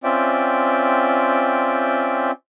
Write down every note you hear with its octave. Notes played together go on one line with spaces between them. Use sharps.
C4 C#4 F4 D5 E5 G5